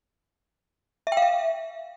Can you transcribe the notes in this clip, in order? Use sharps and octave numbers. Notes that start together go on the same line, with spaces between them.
E5
G5
F5
E5